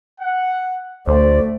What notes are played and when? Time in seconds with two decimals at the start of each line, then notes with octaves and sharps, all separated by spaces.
0.20 F#5
1.08 D2 A3 C5 D5